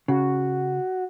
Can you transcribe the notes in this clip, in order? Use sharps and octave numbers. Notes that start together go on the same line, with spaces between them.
C#3 F#4